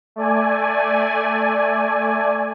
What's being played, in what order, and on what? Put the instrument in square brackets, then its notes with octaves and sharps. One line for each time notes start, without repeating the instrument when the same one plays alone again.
[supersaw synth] A3 D5 G#5